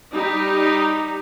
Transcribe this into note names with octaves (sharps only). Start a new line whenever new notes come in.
G3 D#4 G4